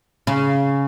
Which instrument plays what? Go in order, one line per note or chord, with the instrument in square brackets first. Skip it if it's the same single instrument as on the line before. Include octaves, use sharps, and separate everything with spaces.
[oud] C#3